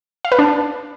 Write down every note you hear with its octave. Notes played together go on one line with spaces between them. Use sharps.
F5
B4
D4